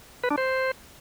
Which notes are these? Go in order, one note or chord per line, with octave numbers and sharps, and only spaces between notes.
B4
D4
C5